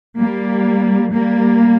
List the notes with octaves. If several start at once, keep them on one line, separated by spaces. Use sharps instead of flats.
G3 A#3
G3 A#3